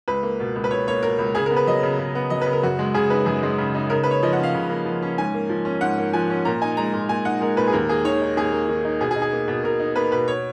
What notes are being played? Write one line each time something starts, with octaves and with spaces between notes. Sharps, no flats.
C#2 B4
A#3
B2
C#2
B4
C#2 C#5
A#3 C#5
B2 A#4
C#2
C#3 G#4
A#4
B3
B4
F#3 D#5
C#3
C#3
B3
F#3 D#5
B4
C#3
A#4
F#2 F#4
G#3
C#3 G#4
D#4 B4
F#2 G#4
G#3
C#3
D#4
C#3 A#4
A#3 B4
C#5
F3 D#5
F#5
C#4 F5
C#3
A#3
F3
C#4
G#2 G#5
A#3
F3
C#4
G#2 F#5
A#3
F3 G#5
C#4
A#2 A#5
D#4 G#5
G#3 A#5
A#2
A#2 G#5
D#4 F#5
G#3 A#4
A#2 B4
G#4
D#2 A#4
A#3 G#4
D#3 C#5
D#4
D#2 G#4
A#3
D#3
D#4
B2 G#4
G#4
D#4
G#4
A#3
B2
B2 A#4
D#4
A#3 B4
B2 B4
C#5